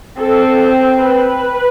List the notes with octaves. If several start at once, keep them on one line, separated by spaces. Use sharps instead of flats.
C4 A4
B4